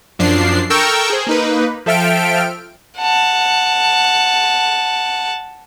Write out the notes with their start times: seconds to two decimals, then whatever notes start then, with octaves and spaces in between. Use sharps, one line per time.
0.19 F#2 F3 D4 C7
0.70 A4 A#4 G5 C#6 E6
1.10 G#4 C5
1.27 A#3 D#4 B4
1.86 F3 A4 E5 G5 F6 D7
2.98 F#5 A5